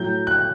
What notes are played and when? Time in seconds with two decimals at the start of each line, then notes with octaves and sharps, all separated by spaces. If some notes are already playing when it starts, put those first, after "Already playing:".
Already playing: A2 F#3 G6
0.27 F#6